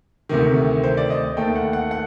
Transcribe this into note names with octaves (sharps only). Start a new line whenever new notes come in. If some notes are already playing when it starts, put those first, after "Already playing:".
D2 C3 D#3
C5
D5
D#5
D#2 D#3 A3 G5
F#5
F#5
F#5